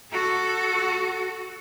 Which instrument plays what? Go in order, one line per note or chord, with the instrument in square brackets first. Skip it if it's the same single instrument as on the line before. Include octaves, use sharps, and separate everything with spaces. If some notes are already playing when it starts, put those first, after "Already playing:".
[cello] F#4 A4